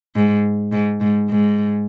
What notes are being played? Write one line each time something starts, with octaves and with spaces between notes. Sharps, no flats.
G#2
G#2
G#2
G#2